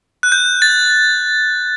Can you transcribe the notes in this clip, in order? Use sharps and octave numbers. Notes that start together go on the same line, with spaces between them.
F#6
G6
A6